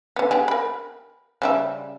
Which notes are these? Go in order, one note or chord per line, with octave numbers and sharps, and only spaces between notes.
D3 B3
B3 G4 G#4
A#4 B5
C#3 G3 E5